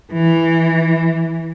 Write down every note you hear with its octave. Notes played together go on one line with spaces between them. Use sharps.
E3